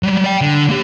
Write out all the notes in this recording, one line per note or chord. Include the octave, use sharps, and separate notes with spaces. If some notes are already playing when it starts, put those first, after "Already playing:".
F#3 G3
D5 G5
D3
A#3 G4